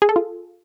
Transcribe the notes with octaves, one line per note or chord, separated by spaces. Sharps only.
G#4
A4
F4